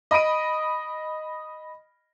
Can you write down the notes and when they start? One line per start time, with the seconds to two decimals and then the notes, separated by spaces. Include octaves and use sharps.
0.11 D#5 B5 D#6 D7 D#7